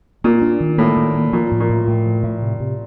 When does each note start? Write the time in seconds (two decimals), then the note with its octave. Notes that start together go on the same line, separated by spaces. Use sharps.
0.24 A#2 A#3
0.42 D4
0.61 D#3
0.78 A2 A#3
0.97 D#3
1.14 A#3
1.33 A#2 F3
1.51 A2
1.60 A#2
1.69 A2
1.87 A2
2.06 F3
2.23 A2
2.42 C3
2.60 C3